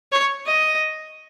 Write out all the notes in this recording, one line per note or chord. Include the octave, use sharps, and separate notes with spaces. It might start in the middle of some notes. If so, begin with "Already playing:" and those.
C#5
D#5